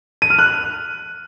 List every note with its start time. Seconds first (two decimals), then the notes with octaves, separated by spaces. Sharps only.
0.22 D#7
0.30 F6
0.39 F#6